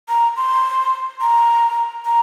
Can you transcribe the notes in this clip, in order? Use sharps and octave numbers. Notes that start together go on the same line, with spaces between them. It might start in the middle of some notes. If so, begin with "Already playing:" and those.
A#5
C6
A#5
A#5